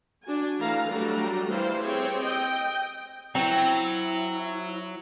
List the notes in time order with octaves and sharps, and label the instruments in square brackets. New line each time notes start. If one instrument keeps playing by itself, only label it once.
[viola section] D4 F#4 G#5
D3 E3 A3 A4 F5 A#5
F#3 G3 A3 D4 F#4 A#5
E3 G3 E4 C5 F5
C4 G4 G#4 C#5
D#5 G5
[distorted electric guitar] F#3 [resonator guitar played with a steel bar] C4 [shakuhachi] E4 [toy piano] G5